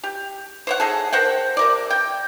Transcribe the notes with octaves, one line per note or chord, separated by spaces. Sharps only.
G4
C5 C#5 F#5
D#4 G#4 A4
A#4 C5 F#5 G5
C3 A#4 D5
G5